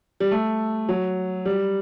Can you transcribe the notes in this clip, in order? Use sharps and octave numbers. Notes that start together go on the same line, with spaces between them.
G3
A3
F#3
G3